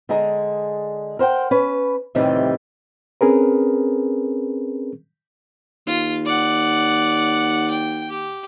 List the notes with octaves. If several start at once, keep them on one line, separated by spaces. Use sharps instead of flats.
D3 G#3 G#4 A#5
A#4 C5 F#5 G5
C#4 B4
F2 A2 C3 D#3 E3 G3
C4 C#4 G#4 A#4 B4
D#2 F4
D5 F#5
G5
G4